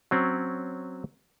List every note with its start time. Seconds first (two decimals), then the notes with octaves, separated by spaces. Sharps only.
0.11 F#3 C4 C#4